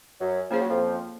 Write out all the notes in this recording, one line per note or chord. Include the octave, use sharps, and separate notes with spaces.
F#2 F#3
F3 A#3 C#4 G#4 C#5
F#3
F2 F3